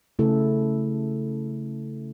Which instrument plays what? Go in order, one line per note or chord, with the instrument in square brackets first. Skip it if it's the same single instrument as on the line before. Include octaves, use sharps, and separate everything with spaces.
[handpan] C#3 A3 E4 A4